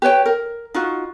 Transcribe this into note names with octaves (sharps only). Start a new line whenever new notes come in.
G4 B4 C#5 G5
A#4
D#4 F4 F#4